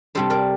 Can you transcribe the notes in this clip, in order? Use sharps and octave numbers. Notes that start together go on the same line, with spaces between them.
C3 G3 D4 A4 C5
A#4 D5